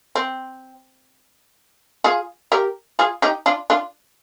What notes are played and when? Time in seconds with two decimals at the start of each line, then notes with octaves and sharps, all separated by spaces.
0.15 C4
2.04 F4 G#4
2.52 G4 A#4
2.99 F4 G#4
3.22 D#4 G4
3.46 D4 F4
3.70 D4 F4